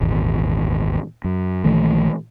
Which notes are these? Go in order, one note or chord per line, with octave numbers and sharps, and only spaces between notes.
D#1 G#1 E2
F#2
A#1 D#3 E3 A3